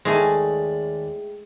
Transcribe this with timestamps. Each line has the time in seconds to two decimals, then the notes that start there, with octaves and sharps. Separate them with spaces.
0.05 D#2 G#3 A3 G#4 D5 E5 G5 G#5